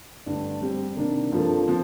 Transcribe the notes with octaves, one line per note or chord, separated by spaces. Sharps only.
G2 D3 A3 D4
G3 C4 G4
C3 D#3 A#3 D4
G2 F3 A#3 F4 A4
F3 C4